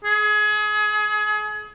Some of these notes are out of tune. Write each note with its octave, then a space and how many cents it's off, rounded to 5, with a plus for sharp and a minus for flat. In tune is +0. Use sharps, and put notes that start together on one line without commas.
G#4 +30